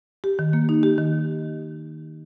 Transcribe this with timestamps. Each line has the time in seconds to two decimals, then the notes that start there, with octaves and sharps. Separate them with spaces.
0.24 G4
0.39 D#3
0.53 A#3
0.69 D#4
0.83 G4
0.98 D#3